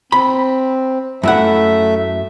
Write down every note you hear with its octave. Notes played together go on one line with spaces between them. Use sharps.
C4 B5
F#2 A3 E4 E5 F#5